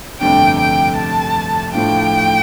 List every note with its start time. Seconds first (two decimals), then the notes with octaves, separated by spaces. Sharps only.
0.21 G1 F2 C3 A3 D4 G5
0.60 G5
0.96 A5
1.73 A2 F3 A3 D4 F4 G5